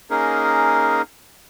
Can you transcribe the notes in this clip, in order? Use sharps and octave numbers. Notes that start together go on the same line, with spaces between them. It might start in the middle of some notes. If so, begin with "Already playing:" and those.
A#3 C#4 D#4 G#4 A#4